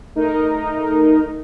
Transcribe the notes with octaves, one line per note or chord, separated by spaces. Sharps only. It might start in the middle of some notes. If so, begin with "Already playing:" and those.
A3 D#4 A#4 D#5